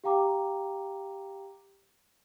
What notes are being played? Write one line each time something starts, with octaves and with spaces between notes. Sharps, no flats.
G4 F5 G5 A#5 D6